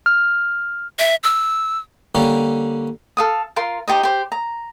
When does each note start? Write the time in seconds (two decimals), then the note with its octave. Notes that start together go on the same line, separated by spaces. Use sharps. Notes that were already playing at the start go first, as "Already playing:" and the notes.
0.06 F6
0.99 E5
1.23 E6
2.15 D3 G3 A#3 C#4
3.17 A4 F5 D#6
3.56 F4 A#4 C6
3.88 D#4 G4 C5 D#5
4.03 G4 C5
4.32 A#5